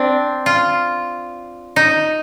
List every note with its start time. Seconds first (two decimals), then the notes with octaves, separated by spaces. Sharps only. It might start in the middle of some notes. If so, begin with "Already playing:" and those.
Already playing: C4 D4
0.46 F4
1.76 D#4